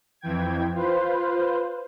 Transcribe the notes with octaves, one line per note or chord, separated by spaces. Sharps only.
F2 E3 G5 G#6
F4 B4 C5